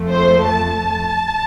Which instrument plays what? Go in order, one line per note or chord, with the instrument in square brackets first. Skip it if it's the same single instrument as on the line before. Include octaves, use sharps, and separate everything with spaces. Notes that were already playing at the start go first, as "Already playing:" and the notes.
Already playing: [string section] F2 F3 A3
C5
A5